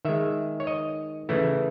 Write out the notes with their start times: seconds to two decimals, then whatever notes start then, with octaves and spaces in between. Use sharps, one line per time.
0.05 D#3 G#3 E5
0.60 C#5
0.67 D#5
1.29 C#3 E3 A3 E4